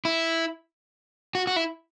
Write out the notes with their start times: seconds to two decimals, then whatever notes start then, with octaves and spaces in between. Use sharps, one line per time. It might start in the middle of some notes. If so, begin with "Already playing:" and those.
0.05 E4
1.35 F#4
1.47 F#4
1.56 E4